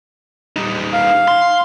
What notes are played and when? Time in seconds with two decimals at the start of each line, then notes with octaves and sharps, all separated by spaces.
0.56 G3 D#4
0.93 F5
1.28 C6